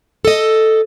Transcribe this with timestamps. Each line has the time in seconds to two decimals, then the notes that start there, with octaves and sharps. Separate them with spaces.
0.25 A4 D#5